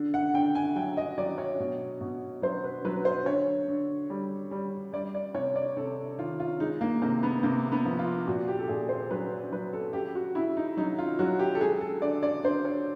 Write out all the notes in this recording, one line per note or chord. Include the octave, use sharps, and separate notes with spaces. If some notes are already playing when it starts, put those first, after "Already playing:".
Already playing: D3
F#5
D3 G5
G#5
F#3 G5
D#5
F#3 D5
C#5
B2
B2
F#3 C5
B4
F#3 B4
C5
D3 C#5
D3
G3
G3
G3 D5
D5
C3 C#5
D5
C3 A4
D#3 F4
F4
G#3 D#4
A#3
C3 A#3
B3
C3 A#3
B3
F3
F4
A#2 F#4
G4
A4
A#2 G#4
C5
F#3 B4
F#3 B4
A4
C#3 G4
F#4
C#3 E4
D#4
F#3 D#4
F4
F#3 F#4
G4
A4
G#3 G#4
A4
D3 D5
D5
D3 C5
C#5